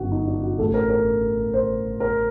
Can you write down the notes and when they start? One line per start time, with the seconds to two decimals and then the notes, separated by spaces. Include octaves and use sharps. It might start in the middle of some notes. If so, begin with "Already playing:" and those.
Already playing: G1 F#2 F#4
0.12 D#4
0.27 D4
0.42 F#4
0.58 A1 A4
0.63 A2
0.74 A#4
0.90 A#4
1.54 C5
2.00 A#4